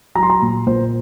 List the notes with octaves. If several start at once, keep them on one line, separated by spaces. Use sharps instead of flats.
F#3 A#5
C6
A#5
A#2
A#2 C5